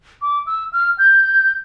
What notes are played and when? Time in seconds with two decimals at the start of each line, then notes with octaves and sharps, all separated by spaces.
0.22 D6
0.47 E6
0.73 F6
0.98 G6